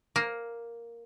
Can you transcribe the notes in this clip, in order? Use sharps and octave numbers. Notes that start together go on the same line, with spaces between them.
A#3